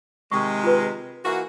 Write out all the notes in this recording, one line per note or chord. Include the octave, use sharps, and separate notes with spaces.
C3 D#3 G#3 C#6
F4 B4
E3 A#3 F#4